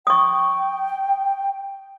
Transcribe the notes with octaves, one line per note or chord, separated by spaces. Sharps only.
G5 C#6 D#6